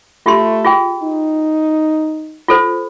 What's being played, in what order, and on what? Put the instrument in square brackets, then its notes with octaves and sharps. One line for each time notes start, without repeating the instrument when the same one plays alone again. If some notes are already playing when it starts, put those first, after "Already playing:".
[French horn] A3 [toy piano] F4 G4 C6
[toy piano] F4 G#4 G5
[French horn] D#4
[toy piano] F4 A4 C5